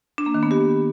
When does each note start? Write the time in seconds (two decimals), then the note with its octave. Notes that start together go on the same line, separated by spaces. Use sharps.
0.18 D4
0.26 A#3
0.34 D#3
0.43 B3
0.51 G4